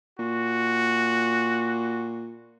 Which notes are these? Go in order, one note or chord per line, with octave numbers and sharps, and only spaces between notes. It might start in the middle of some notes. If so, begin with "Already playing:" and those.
A#2 F#4